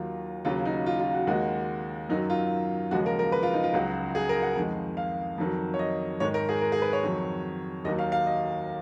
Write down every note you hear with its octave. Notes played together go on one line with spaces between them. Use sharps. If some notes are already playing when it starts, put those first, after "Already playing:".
Already playing: D#2 D#3 F#3 F4
D#2 C#3 F#3 F4
D#4
F4
F4
F#4
D#2 D#3 G#3 F#4
F#2 D#3 F#3 D#4
F4
D#2 C#3 F3 G#3 F#4
A#4
A#4
B4
F4
D#4
F4
C#2 C#3 F#3 F#4
G#4
A#4
F#5
F2 D#3 G#3
F5
F2 D#3 F#3
C#5
D#5
G#2 D#3 G#3 C#5
A#4
G#4
A#4
G#4
B4
C#5
F2 D#3 F#3
D#2 D#3 F#3 D#5
F5
F5
D#5